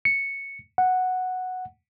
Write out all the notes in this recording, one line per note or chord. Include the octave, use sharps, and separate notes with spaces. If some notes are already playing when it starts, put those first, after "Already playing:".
C#7
F#5